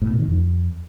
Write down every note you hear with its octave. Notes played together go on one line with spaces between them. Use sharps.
A2
B2
D#3
F2